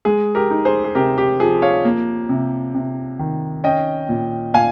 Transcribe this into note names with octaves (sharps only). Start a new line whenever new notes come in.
G#3 G#4
G4 A#4
D#4
G#4 C5
G#4
C3 G4 A#4
G4
F3 G#4
C#5 F5
A#3
C3
C3
D#3
C#4 D#5 G5
A#2
A#2 F5 G#5